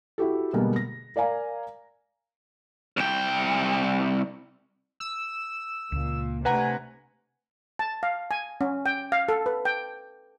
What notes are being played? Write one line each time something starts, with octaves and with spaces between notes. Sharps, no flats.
E4 F#4 G4 A4
B2 D3 G3 G#3 A#3 B3
A#6
A#4 D5 F5 G#5 A#5
C2 G5
E6
C#2 A#2
C3 A3 D4 B4 F#5 G#5 A#5
A5
F5
G#5
C#4
G5
F5
A4
B4
G5